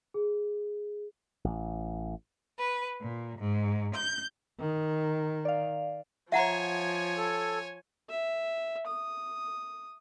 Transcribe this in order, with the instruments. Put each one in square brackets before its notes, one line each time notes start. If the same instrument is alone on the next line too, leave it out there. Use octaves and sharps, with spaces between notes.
[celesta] G#4
[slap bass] A1
[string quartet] B4
A#2
G#2
G6
[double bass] D#3
[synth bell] D5 F5
[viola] F3 [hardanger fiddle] C#5 G#5 [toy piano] E5 F#5 A#5
[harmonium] A4
[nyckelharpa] E5
D#6